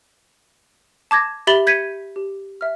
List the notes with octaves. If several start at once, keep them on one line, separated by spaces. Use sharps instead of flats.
A5 D6 G#6 A#6
G4 E5 B5 A6 F#7 G7
G6 G#6 B6 C#7 D#7
G4
E5 F6